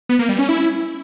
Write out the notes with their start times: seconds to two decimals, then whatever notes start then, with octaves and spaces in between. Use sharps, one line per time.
0.09 B3
0.19 A#3
0.29 G3
0.39 C#4
0.49 E4